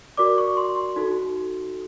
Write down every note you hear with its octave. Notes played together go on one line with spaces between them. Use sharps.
F#4 A#4 D5 D6
C#6
C6
C6
D#4 F#4 A4